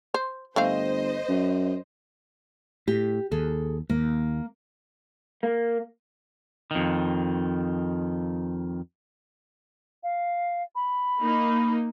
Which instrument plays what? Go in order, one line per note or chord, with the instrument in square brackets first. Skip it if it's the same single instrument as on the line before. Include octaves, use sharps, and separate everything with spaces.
[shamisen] C5
[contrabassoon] G1 [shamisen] A3 C4 F5 [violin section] C5 D#5
[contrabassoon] F#2
[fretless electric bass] A2 [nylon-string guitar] G4
[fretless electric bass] D#2 [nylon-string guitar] G#4 A4
[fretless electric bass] D#2 [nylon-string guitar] A#3
[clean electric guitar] A#3
F2 D#3
[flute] F5
B5
[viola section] A#3 D#4